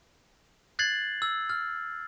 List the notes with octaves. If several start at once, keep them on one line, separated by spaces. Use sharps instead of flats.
F#6 G#6 A6 C7 F#7
E6
F6